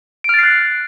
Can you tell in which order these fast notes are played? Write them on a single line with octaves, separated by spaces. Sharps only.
D7 F6 A6 C7 F#6